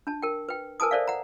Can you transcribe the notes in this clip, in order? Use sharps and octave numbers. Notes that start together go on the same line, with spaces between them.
D4 A5
A#4 G5
B4 G5
A#4 B4 G#5 A5 D#6
A4 A#4 C5 D5 E5 F5
F#5 A#5